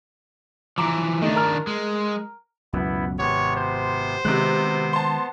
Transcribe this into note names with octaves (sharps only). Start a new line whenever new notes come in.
E3 F3 A#5 D6
D#3 A3 D4 D#4
A#4 A#5 F6
G#3
C#2 F#2 B2 B3 E4
G#1 C3 B3 C#5
C5
C3 D#3 G#3 B3 F#6
A5 C6